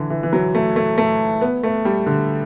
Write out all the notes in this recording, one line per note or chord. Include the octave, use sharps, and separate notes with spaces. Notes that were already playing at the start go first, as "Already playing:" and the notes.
Already playing: D3 E3
E3
E3
F#3
A3
A3
A3
B3
A3
G3
D3